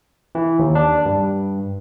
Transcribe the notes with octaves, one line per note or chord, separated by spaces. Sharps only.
E3
D#2
D4
G2